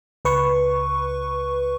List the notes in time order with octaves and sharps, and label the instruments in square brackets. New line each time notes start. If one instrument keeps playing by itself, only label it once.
[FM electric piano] C#2 B4 C#6